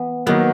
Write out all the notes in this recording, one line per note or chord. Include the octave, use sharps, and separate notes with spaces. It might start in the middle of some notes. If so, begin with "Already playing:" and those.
Already playing: E3 B3
D#3 F#3 A#3 B3